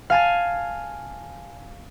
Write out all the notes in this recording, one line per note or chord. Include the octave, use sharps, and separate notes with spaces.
F5 G#5 A5